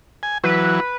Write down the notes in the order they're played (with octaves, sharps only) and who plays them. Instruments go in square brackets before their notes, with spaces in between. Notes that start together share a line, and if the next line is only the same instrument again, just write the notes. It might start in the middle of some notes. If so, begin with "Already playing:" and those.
[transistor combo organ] G#5
[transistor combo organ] E3 F#3 [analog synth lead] B4